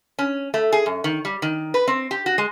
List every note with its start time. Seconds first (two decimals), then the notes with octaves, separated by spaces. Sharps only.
0.19 C#4
0.54 A3
0.73 G#4
0.86 F#2
1.04 D#3
1.25 G3
1.42 D#3
1.74 B4
1.88 C4
2.11 G4
2.26 F#4
2.38 G#3